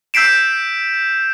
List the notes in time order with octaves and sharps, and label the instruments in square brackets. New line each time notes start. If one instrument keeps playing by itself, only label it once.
[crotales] E6 G6 B6 C7 D7 E7